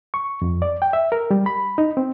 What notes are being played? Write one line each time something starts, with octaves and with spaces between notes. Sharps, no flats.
C#6
F2
D5
G5
E5
A#4
G3
B5
D#4
C4